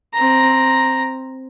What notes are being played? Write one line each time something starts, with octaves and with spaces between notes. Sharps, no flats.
C4 A#5